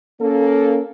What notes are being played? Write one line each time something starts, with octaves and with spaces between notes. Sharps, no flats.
A#3 C#4 A4